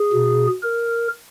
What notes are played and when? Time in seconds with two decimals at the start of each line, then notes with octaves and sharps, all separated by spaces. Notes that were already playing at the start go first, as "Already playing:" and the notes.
Already playing: G#4
0.13 B2
0.63 A#4